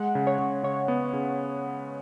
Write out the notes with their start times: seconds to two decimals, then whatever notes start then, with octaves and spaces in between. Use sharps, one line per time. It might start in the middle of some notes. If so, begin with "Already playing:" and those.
Already playing: G#3 F#5
0.15 C#3
0.27 C#5
0.39 C#3
0.63 C#3 C#5
0.88 B3
1.13 C#3